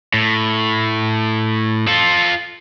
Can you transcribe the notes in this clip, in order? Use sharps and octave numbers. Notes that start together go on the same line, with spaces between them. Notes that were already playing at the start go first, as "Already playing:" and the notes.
A2
F4 A4